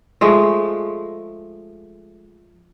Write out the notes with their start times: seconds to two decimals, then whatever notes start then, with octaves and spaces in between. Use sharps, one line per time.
0.21 F3 G#3 A3